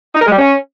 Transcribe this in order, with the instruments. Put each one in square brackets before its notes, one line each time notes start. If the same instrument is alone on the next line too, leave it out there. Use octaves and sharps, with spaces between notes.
[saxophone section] D#4
A#4
G#3
G3
C#4